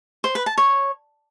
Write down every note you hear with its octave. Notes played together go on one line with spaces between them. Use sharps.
C5
B4
A5
C#5